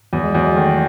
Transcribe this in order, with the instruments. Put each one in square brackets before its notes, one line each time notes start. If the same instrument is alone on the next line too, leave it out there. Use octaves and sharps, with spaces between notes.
[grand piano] E2 [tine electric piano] F#3
[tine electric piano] G#3
[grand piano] E2 [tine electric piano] F#3
[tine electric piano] G#3
[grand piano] D#3 [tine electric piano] A3